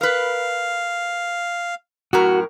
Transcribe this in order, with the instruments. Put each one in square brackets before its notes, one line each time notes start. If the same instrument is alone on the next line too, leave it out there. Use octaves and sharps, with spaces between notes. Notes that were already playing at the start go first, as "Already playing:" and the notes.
[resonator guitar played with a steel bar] A#4 B4 [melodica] F5
[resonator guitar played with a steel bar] F#2 A2 A#4 [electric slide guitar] F#4